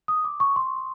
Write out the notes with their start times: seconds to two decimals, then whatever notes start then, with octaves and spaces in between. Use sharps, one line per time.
0.08 D#6
0.25 D6
0.40 C#6
0.56 C6